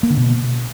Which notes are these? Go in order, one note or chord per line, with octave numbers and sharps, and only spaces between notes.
A#3
D3
B2